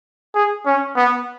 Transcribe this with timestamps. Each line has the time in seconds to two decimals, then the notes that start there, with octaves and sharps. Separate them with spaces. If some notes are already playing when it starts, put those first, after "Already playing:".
0.35 G#4
0.66 C#4
0.96 B3